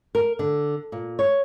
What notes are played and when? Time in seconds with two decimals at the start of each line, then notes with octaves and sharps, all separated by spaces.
0.15 A#4
0.39 D3
0.92 A#2
1.19 C#5